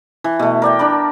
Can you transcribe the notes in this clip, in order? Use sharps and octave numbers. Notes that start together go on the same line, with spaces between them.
E3
B2 A3
A#4 D5 G5
D4 A#4 B5